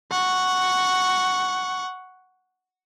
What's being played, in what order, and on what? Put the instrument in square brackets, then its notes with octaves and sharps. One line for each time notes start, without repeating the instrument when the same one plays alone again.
[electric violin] F#5 C#6